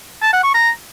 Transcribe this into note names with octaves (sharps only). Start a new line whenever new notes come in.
A5
F#5
C#6
A#5